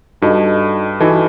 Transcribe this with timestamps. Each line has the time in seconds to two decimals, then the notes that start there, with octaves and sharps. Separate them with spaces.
0.22 G2 D#4 F#4 A4 D#5 A5
1.00 E3 D#4 F#4 A4 D#5 A5